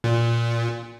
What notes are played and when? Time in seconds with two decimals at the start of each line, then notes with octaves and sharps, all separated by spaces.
0.04 A#2